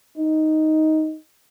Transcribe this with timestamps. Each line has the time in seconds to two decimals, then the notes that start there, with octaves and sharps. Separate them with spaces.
0.17 D#4